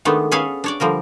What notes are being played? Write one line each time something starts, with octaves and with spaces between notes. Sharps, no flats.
D#3 G#3 A3 B3 D4
C#4 G#4 A4 B4 F5 G#5
D4 C#5 D5
D3 F3 G3 A#4